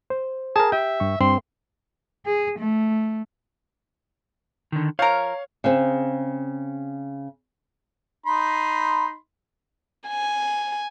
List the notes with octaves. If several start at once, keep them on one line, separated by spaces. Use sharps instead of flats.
C5
G#4 A#4 A5
G4 E5 G5
G2 C#6
G2 C4 C6
G#4
A3
D3 D#3
F3 A#4 C#5 F5
C#3 C4
D#4 B5 C6
G#5